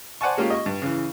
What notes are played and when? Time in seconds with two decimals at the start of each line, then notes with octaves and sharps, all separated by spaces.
0.21 C5 D5 F#5 G#5 A5 C#6
0.37 G#3 A#3 C#4 F4 G4
0.50 D#5 C#6
0.66 G2
0.82 C#3 E3